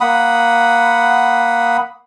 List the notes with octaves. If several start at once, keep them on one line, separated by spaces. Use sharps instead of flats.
A#3 F#5 B5 D#6